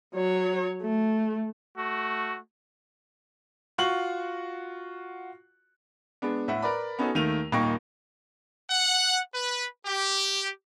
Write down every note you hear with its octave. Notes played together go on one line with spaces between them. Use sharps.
F#3 C#5
A3
A3 F#4
F4 F#4 C#6 F#6 F#7
G#3 B3 D4
A2 E5 F#5
A#4 B4 D5 B5
B3 C#4 D#4 F#4 A4
D#2 D#3 A3 D#7 F7
D#1 A#3 D#4 G5 C#6 A#6
F#5
B4
G4